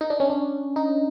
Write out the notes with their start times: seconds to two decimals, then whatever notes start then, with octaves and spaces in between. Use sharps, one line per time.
0.01 D#4
0.10 D4
0.20 C#4
0.30 D4
0.76 D#4